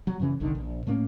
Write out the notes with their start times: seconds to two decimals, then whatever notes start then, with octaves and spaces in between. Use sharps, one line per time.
0.07 F#3
0.19 F#2 C#3 E3 C#4
0.40 G1 C2 D3 D#3
0.55 A#1
0.87 A2 A3 A#3 C#4